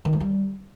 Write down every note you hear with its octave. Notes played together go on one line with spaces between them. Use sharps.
D#3
A3
G3